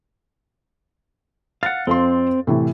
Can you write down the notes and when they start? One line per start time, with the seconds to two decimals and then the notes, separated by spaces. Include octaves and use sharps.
1.63 F5 F#5 A6
1.87 F2 C4 F5 C6
2.47 A2 C3 E3